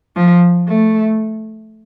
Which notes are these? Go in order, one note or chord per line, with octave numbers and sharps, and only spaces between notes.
F3
A3